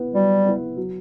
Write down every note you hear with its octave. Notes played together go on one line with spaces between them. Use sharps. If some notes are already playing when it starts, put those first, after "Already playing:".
Already playing: B3 E4 B4
F#3 G3
B3 E4 B4
F#3